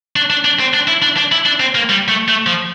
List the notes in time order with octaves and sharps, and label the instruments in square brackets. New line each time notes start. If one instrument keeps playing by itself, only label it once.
[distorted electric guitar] D4
D4
D4
C4
D4
E4
D4
D4
E4
D4
C4
A#3
G3
A3
A3
F3